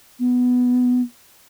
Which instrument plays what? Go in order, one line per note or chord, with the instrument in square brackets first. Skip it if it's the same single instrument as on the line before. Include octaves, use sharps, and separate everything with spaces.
[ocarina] B3